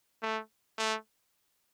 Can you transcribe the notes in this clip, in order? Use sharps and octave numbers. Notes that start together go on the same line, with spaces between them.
A3
A3